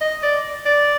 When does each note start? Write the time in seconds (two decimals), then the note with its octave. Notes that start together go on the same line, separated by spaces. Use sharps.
0.01 D#5
0.23 D5
0.66 D5